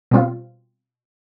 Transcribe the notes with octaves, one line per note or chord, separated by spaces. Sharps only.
B2 G3 C4 F4